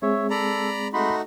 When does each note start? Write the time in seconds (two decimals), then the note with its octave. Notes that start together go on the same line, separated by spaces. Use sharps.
0.02 G#3 C4 G#4 C#5 E5
0.30 A4 D5 A#5 B5
0.93 A3 D#4 F#4 B5 C6